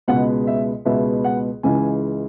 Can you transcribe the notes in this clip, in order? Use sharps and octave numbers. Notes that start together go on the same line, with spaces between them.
C#2 B2 G#3 B3 F#5
E5
C#2 B2 G#3 B3 E5
F#5
C#2 C#3 E3 G#3 G#5